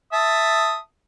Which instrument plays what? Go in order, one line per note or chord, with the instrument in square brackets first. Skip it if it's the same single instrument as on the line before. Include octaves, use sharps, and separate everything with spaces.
[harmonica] E5 A5 D#6